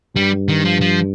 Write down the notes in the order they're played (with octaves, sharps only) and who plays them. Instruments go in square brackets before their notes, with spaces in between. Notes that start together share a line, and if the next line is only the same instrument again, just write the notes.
[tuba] G2 [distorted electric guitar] G3
[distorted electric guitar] D#3
F3
F3